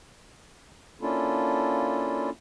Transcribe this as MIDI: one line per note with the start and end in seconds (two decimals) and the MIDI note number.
1.01 2.30 58
1.01 2.30 61
1.01 2.30 62
1.01 2.30 64
1.01 2.30 65
1.01 2.30 69